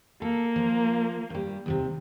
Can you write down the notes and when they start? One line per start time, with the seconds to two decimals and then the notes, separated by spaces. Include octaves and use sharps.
0.22 A#3 A4
0.56 F3
1.30 G2 G3
1.66 D#2 A2 C3